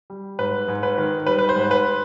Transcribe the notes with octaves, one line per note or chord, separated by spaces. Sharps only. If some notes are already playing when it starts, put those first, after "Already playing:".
G3
G#2 B4
G#2
B4
D#3
G3 B4
B4
C5
G#2
B4